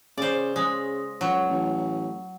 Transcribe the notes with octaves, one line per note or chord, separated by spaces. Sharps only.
C#3 C5 D5
C#3 G#3
C#2 F#3
A1